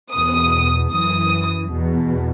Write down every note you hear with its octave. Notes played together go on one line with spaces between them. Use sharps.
E2 B2 D#6
F#2 E3 D#6
E2 B2